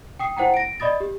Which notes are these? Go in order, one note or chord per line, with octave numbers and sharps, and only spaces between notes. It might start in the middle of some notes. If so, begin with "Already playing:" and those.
G5 D#6 C7
E4 C5 F#5 G5 A#5
A#6 D7
D5 D#5 B5 D#6 A6
G4